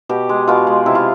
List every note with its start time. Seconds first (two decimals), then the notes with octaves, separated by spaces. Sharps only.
0.09 B2 G4
0.29 G#3
0.48 B2 F4
0.67 G#3
0.86 C3 E4
0.95 F4